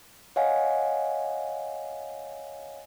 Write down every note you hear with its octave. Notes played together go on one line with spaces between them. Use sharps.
C#5 D#5 F5 F#5 G#5